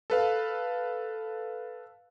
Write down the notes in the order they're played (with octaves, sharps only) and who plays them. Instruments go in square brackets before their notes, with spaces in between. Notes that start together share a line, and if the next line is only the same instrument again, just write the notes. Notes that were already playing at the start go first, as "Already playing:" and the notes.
[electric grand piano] A4 B4 F5